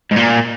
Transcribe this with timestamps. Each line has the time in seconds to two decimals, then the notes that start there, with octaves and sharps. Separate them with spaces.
0.12 G#2
0.17 A#2